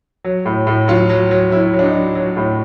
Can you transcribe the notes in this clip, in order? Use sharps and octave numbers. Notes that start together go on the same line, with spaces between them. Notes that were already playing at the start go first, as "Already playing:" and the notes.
F#3
A2
A2
F#3 F4
F#3
F#3
F#3 E4
F#3
D4
D#4
F#3
F#3
A2